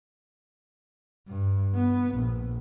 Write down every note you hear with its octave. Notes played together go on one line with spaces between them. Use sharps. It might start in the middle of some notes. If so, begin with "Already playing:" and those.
G2
B3
A#1